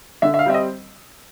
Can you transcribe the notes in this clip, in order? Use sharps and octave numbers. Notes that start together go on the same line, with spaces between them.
D3 E5
E5
F5
G3 C4 E5
D#5